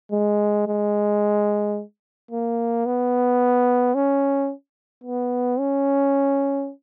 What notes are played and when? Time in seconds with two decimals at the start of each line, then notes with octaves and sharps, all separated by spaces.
0.12 G#3
0.67 G#3
2.31 A#3
2.86 B3
3.95 C#4
5.04 B3
5.59 C#4